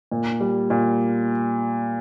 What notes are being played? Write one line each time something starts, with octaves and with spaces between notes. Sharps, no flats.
A#2
G3
A#2